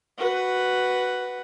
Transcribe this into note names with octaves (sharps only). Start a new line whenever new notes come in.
F#4 B4